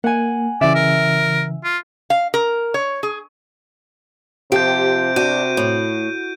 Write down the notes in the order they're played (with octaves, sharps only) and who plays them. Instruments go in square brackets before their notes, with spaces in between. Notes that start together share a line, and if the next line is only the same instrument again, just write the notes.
[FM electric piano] A#3 [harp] F#5 G#5
[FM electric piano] C#3 E3 [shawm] D5 [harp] E5
[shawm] A#4
F4
[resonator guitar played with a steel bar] F5
A#4
C#5
G#4
[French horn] C3 [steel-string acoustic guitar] F3 [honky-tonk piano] G4 [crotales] G6 D7
[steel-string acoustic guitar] D4 [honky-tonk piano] F#4 [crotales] G6 D#7
[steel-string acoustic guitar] A2